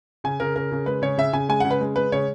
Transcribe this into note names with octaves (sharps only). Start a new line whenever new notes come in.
C#3 G#5
C#3 A#4
C#3 A#4
C#3
G#3 B4
C#3 C#5
C#3 E5
C#3 G#5
G#3 G#5
C#3 F#5
B4
G#3
G#3 B4
C#3 C#5